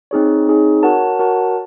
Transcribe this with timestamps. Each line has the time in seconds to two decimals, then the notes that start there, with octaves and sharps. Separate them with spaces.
0.11 C4 D#4 G#4 C#5
0.47 C4 D#4 G#4 C#5
0.83 F#4 A#4 C#5 F#5 A5
1.19 F#4 A#4 C#5 F#5 A5